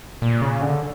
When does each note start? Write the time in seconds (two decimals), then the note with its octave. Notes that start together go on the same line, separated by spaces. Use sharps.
0.22 A#2
0.41 C#3
0.61 D3